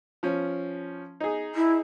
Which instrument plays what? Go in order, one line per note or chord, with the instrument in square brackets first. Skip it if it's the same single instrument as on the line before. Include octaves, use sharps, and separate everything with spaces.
[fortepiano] F3 C#4
D#4 G#4
[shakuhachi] E4